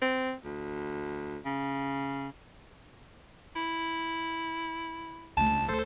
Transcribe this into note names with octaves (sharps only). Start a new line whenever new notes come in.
C4
D2
C#3
E4
C#2 A3 D4 A5
D2 A4 C5